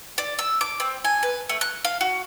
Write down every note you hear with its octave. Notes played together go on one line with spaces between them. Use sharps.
D5
E6
D6
C4
G#5
B4
A3
F#6
F5
F#4